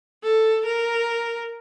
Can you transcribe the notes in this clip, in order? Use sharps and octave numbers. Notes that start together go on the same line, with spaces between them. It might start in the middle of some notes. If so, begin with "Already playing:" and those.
A4
A#4